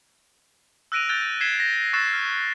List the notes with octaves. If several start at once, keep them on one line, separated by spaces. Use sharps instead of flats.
E6 F#6 A#6 D7 D#7 F7
F#6 G6 A6 F7 G7
G#6 B6 C7 E7 G7
A#6
C#6 E6 F#6 A6 C7 E7
F6